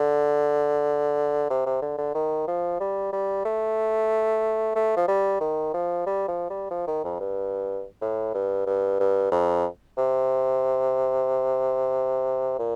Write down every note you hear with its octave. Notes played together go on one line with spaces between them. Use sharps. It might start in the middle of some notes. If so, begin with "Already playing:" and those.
Already playing: D3
C3
C3
D3
D3
D#3
F3
G3
G3
A3
A3
F3
G3
D#3
F3
G3
F3
G3
F3
D#3
F2
G2
A2
G2
G2
G2
F2
C3
A#2